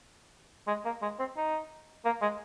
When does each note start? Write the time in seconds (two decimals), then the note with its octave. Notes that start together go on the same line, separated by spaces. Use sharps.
0.67 G#3
0.85 A#3
1.02 G#3
1.19 C4
1.37 D#4
2.05 A#3
2.22 G#3